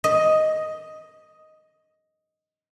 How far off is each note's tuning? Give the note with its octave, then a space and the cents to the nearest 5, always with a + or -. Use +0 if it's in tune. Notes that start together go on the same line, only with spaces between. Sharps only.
D#5 +5